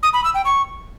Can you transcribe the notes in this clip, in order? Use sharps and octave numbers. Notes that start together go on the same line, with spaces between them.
D#6
B5
E6
G5
C#6